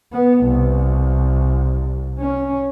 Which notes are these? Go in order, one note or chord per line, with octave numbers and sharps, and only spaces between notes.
B3
C2
C#4